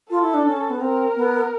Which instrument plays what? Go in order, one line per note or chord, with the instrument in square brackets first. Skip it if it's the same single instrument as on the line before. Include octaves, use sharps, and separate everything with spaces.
[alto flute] F4 [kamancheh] A4
[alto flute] E4
D4
C#4
B3
[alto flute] C4 [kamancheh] A#4
[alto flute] B3